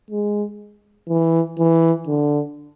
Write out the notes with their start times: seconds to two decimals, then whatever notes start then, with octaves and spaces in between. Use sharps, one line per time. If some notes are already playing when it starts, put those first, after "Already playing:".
0.10 G#3
1.09 E3
1.59 E3
2.07 D3